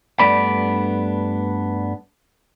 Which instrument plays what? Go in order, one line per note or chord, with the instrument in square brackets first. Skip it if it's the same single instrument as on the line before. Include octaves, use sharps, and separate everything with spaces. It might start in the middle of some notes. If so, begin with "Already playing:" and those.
[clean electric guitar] G2 A3 B3 D4 D5 B5